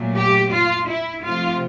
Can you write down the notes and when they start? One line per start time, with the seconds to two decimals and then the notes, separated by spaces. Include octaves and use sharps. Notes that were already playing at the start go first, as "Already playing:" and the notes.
Already playing: A#2 F#3 A3
0.16 G4
0.52 F4
0.88 E4
1.24 C3 F3 A3 F4